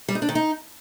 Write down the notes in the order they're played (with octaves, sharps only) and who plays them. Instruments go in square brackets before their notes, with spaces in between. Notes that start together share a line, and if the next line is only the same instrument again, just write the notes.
[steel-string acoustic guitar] G3
D#4
D4
D#3
D#4